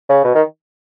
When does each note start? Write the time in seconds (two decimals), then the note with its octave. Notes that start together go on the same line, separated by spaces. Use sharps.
0.09 C#3
0.24 B2
0.35 D#3